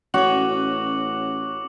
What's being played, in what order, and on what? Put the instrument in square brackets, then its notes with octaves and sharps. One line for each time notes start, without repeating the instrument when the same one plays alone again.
[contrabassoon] A1 [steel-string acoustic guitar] C#4 C#5 [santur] F#4 [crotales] D6 C#7 F#7